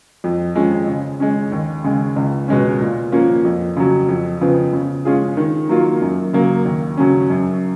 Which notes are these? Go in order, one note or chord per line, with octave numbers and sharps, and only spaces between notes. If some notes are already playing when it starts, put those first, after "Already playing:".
F2
F3 G#3 C#4
C#3
G#3 C#4
D#2
C#3 G#3
C#2
B2 G#3 C#4
A#2
F3 A#3 C#4
F2
C#3 F#3
F2
C#3 F3 B3
C#3
G#3 C#4 F4 G#4
D#3
F#3 A#3 F4
F#2
C#3 F#3 A#3
D#2
C#3 F#3 C#4
F#2